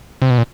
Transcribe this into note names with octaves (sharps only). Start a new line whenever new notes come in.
C3
B2
A#2